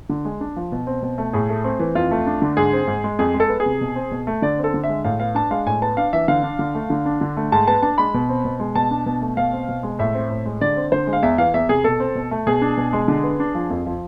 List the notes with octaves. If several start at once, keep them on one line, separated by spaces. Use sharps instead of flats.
D3
G#3
D4
F3
B2
C4
B2
A3
A2 G#4
A3
C4
E3
F2 F4
A3
D4
D3
G#2 G#4
C4
G#2
G#3
F2 G#4
G#3
A4
B3
G#4
C3
B2
C4
B2
A3
D3 D5
C4
A4
D3
E5
G#3
A2 F5
B3 F5
D4 A5
G#3 F5
A2 G#5
B3 A5
D4 F5
E3 E5
D3 F5
D4
D3
A3
D3
D4
D3
A3
G#2 A5
B3 A5
D4 A5
G#3 B5
B2
C4
B2
G#3
B2 A5
D4
B2
A3
B2 F5
C4
B2
G#3
A2 E5
C4
A2
G#3
D3 D5
C4
D3 C5
G#3
F5
E2 E5
E3 F5
E2 E5
C3 G#4
B2 A4
C4
B2
A3
B2 G#4
D4
B2
G#3
D3
B3
D4
F3
F2
F3